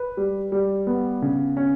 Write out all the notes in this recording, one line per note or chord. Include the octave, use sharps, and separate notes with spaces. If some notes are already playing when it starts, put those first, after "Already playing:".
Already playing: B4
G3
G3
B3
C#3
C#4